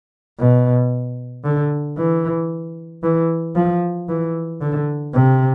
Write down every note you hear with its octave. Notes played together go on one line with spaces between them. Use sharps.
B2
D3
E3
E3
F3
E3
D3
C3